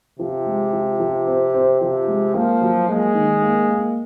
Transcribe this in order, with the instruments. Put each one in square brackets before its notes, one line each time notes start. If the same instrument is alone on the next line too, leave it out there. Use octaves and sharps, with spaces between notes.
[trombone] C3 [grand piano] F3
[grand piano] G#3
F3
F3
C4
C4
[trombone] C3 [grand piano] F3
[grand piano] G#3
[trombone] F3 [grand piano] A#3
[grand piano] F#3
[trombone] G#3 [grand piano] A#3
[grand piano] D#3
A#3
A#3